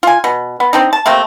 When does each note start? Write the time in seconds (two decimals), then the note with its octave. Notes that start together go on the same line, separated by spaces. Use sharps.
0.03 F4 G#5
0.24 B2
0.60 B3
0.73 C4 D4 D#4
0.93 A5
1.06 C3 A3 A#3 C4